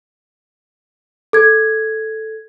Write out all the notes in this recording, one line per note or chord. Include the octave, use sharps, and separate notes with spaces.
A4 G#6